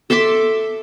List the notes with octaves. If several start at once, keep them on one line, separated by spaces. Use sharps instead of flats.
A4 E5 C6 D6